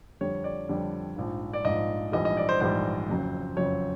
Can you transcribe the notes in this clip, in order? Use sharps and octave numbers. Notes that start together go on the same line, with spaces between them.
F2 D3 G3 C#5
D5
F2 D3 G3
A#1 G#2 F3
D5
A#1 G#2 F3 D#5
A#1 G#2 E3 G3 D#5
D#5
D5
C5
A#1 G#2 E3 G3 C5
F#1 F2 C#3 F#3
F#1 F2 C#3 F#3 C#5